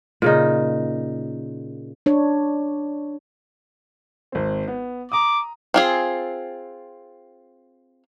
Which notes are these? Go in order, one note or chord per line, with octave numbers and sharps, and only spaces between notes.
A#2 C#3 D#4
D4 C#5
G#1 C4
B3
A#5 D6 D#6
C4 F4 G#4